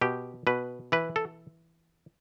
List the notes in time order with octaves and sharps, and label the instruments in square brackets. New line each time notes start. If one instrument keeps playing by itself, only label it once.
[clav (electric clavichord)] B2 G4
B2 B4
E3 B4
A4